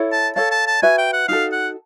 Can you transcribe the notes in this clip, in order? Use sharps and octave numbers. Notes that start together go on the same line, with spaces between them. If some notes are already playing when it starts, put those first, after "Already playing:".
Already playing: E4 A4 C#5
A5
A4 C#5 F5 A5
A5
A5
F#4 B4 E5 G#5
G5
F#5
D#4 F#4 A4 F5
F#5